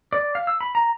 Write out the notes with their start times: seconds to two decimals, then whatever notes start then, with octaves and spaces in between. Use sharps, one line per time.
0.13 D5
0.35 F5
0.47 E6
0.61 B5
0.75 A#5